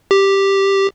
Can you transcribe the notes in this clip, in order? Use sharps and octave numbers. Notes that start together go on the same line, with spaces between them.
G4